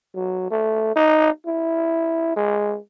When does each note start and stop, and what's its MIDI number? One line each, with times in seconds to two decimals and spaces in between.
0.15 0.46 54
0.51 0.95 57
0.96 1.30 63
1.46 2.34 64
2.36 2.78 56